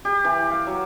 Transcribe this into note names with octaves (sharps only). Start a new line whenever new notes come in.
G4
E3
F5
F#3